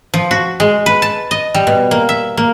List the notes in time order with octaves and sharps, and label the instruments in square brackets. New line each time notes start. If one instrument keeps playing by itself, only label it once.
[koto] F3
F#4
G#3
B4
A5
D#5
G3
B2
A#3
E5
A#3